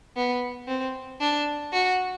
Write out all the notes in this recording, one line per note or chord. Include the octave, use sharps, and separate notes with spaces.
B3
C4
D4
F#4